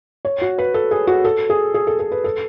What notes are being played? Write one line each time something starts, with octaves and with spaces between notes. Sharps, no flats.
C#5
F#4
B4
A4
G#4
F#4
A4
G#4
G#4
A4
A4
B4
A4